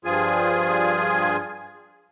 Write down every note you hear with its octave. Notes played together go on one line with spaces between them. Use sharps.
G2 F3 F4 G#4 G#5